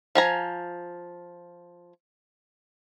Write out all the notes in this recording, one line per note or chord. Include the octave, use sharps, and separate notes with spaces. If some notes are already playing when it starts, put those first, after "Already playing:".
F3 G#5 A#5